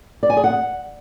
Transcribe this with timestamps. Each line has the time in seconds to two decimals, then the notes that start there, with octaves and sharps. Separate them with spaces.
0.23 D5
0.30 G#5
0.37 G#4
0.44 F#5